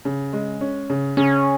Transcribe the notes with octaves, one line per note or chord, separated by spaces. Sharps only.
C#3
G#3
C#4
C#3
C#3 C#4